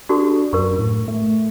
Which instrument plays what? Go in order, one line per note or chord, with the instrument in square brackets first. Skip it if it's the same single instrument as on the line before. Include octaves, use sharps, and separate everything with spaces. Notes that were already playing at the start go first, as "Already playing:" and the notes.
[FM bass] D4 [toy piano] F#4 G4 A4
[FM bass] F#2 [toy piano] A#4 C#6
[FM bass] A2
A3